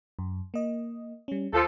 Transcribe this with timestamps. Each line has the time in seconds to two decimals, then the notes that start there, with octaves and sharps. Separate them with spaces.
0.19 F#2
0.54 A#3 D#5
1.28 G3 C#4
1.53 D#2 F3 A4